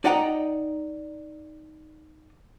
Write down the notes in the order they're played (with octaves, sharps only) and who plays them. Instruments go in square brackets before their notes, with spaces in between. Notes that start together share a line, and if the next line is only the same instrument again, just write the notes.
[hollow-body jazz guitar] D#4 D5 D#5 F#5 G5 A#5